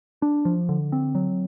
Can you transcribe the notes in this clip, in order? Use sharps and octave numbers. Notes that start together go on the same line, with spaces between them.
D4
F3
D3
C4
F#3